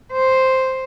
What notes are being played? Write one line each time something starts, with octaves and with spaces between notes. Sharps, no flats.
C5